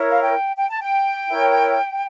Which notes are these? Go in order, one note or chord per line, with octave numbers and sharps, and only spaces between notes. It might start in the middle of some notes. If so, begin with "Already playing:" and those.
Already playing: E4 A#4 C#5
F5
G5
G5
A5
G5
E4 A#4 C#5